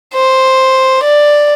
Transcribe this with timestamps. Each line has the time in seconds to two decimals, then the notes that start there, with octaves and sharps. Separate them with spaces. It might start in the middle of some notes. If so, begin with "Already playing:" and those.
0.14 C5
1.04 D5